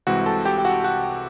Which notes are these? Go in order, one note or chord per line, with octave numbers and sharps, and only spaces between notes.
C2 C3 E3 G#3 C4 F#4 F#5
A4 A5
G4 G5
G5
F#4 F#5
F#4 F#5